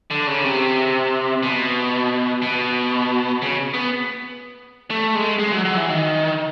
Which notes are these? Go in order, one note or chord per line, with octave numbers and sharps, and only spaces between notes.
D3
C#3
C3
B2
B2
C#3
B3
A3
G#3
G#3
F#3
F#3
E3
D#3